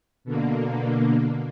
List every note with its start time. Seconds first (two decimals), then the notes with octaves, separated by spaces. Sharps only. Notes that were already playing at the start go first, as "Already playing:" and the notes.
0.24 B2 D3 A#3